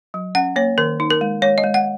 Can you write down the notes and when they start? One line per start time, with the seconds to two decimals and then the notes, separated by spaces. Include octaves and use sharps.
0.14 F#3
0.35 C#4 F#5
0.56 A#3 C#5
0.78 D#3 A#4
1.00 D#4
1.10 A#4
1.21 G#3
1.42 G#3 C#5
1.58 D#5
1.64 G#3
1.74 F#5